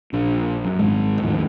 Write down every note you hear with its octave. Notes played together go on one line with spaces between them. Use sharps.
A#1 D4
F#2
G#1 G#2 G#3
E2 A2 D#3 F3